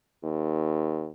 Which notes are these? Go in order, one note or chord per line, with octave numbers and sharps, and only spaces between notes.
D#2